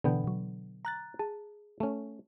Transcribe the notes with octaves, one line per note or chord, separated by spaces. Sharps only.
B2 D3 E3 B3 G5
B2 F#3
A#5 F#6 A6
G#4 A5
A3 C#4